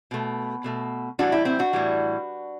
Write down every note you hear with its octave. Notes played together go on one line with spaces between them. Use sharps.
B2 A3
B2 A3
A2 E3 G3 D4 F#4
E4 G4
C4 E4
D4 F#4
A2 E3 G3